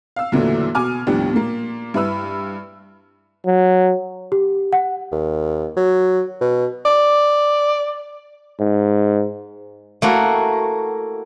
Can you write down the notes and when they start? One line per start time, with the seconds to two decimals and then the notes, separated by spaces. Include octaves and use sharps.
0.16 F5 E6
0.32 E2 A#2 D3 E3 F#3 A3
0.75 B2 G#5 D6 F6
1.07 D#2 A2 F3 G3 B3 D4
1.33 A#2 A#3
1.94 G2 E4 B4 B5 E6
3.47 F#3
4.32 G4
4.73 F#5
5.12 D#2
5.77 F#3
6.41 B2
6.85 D5
8.60 G#2
10.02 A3 A#3 E4 F#4